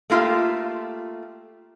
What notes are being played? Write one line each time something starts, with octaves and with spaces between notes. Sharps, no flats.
A3 A#3 F4 G4 E5